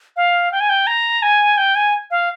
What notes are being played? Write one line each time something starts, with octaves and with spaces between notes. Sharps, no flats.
F5
G5
G#5
G5
A#5
G#5
G5
G#5
F5